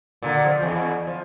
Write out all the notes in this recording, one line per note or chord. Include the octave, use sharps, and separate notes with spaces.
A#2 D3
F3
E2
F3